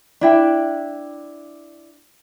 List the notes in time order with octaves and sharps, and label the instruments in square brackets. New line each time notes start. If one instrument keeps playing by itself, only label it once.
[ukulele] D4 E4 G5